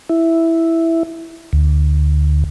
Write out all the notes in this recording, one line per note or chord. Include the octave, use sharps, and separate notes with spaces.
E4
D2